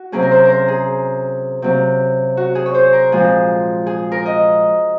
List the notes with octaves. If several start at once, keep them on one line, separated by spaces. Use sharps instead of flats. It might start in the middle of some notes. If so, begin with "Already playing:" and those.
Already playing: F#4
C3 F#3 A#3 C#4 G#4
A#4
C5
A#4 C5
G#4
C3 F#3 A#3 C#4
F#4
G#4
C#5
C5
A#4
A#2 F3 G#3 C4 G#4
G#4
A#4
D#5